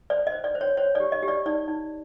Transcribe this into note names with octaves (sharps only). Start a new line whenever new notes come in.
C5 D5
D#5
C5
D5
C5
C#5
C5 C#5
G4 D5
D#5
G4
D5
D#4 D5
D#4